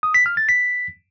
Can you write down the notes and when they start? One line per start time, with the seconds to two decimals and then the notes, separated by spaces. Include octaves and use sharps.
0.03 D#6
0.14 B6
0.26 F6
0.37 A6
0.49 B6